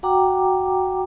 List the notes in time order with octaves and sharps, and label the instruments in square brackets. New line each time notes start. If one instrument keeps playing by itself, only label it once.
[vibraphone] F#4 F#5 G5 A#5 D6